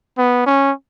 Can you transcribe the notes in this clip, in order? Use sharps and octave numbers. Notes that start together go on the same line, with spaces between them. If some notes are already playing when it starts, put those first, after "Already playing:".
B3
C#4